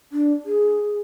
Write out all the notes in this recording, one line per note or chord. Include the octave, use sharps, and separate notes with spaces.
D4
G#4